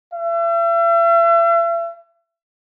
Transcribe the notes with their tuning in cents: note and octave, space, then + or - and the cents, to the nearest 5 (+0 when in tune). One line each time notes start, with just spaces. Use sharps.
E5 +40